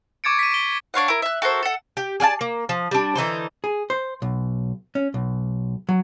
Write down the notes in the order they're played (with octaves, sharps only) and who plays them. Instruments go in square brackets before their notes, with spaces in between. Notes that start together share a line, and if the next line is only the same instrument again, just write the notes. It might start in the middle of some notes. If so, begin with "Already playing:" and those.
[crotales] C#6 D6 G#6 A6 C#7 D7
B6 D#7
D7 G7
[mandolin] D4 C#5 F5 F#5
E4 A#4
E5 F#6
F#4 A4 A#4 C5
A4 F#5
[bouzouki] G4
G#4 D5 F5 A5
A#3
F3
G3 D4
D3 E3 D#4 C5
[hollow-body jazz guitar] G#4
C5
B1
C#4
B1
F#3